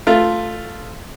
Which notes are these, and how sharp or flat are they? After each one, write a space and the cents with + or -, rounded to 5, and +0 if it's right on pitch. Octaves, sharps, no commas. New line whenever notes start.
A3 +0 F4 +0